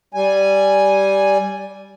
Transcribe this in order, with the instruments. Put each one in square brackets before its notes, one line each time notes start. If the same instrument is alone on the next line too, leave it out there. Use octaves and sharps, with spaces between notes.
[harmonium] G3 G#5